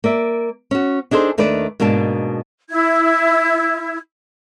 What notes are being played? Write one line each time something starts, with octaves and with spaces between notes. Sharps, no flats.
A#3 D5 E5
C#4 F#4
D4 D#4 G#4 A4 C5
D#2 D#3 A3 D4 B4 D5
G#2 B2 A#3 D4 A5
E4 G#6